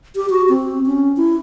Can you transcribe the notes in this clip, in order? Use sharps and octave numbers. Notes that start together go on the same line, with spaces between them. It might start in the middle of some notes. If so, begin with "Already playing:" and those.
G4
F#4
C4
C#4
E4